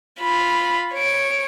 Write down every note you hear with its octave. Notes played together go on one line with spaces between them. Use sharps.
F4 B5
C#5 D7